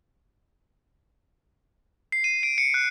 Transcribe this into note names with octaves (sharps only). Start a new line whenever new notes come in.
C7
D#7
D7
C#7
F#6